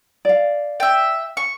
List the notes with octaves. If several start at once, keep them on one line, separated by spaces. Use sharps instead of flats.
D5 F5
E5 G5
C#6